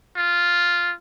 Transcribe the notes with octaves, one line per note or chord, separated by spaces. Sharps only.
F4